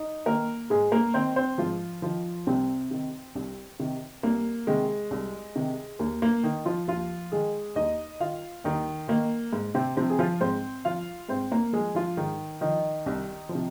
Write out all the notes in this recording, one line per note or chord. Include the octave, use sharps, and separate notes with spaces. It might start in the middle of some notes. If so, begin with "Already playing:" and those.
Already playing: D#4
D#3 A#3 A#4
G#2 G#3 G#4
A#3 A#4
D#3 C4 C5
C4 C5
G#2 F3 F4
D#3 F3 F4
C2 C3 C4
C3 D#3
C2
C3 D#3
C2 A#3
C3 D#3 G#3
C2
C3 D#3
D#2 A#3
A#3
D#3 D#4
F3 F4
D#2 F3 F4
D#3 G#3 G#4
D#2 D#4 D#5
D#3 F4 F5
D#2 D#3 D#4
D#3 A#3
G#2
C3 C4
C3 F3 C4
G#4
F3 F4
G#2 C4 C5
F3 F4 F5
G#2 C4 C5
A#3 A#4
F3 G#3 G#4
F3 F4
G#2 D#3 D#4
D#3 F3 D#4
C2
F3
C3